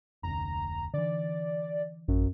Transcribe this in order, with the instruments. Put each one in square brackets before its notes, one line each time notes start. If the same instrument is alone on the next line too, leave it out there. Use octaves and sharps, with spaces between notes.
[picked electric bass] F1 D2 [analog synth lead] A#5
[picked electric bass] D3 E3 [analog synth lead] D5
[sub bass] A1 [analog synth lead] F#2